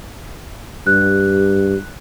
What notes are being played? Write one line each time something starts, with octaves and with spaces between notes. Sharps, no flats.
G2 G4 F#6